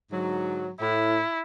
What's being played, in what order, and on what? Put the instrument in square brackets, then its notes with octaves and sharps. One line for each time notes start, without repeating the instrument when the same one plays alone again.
[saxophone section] G#2 D3 F#3
[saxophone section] A2 [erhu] E4